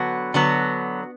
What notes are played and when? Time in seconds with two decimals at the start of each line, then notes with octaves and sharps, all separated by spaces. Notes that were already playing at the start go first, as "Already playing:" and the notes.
Already playing: D3 F#3 B3 F#4
0.34 D3 F#3 B3